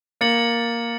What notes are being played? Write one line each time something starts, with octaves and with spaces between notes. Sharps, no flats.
A#3 A6 C#7 F#7